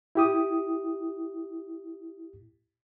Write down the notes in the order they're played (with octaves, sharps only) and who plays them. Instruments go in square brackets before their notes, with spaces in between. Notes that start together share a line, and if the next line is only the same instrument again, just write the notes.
[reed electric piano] E4 G4 D#6